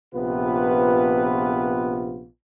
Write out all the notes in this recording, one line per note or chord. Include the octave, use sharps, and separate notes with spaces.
A#1 C3 B3 F4 B4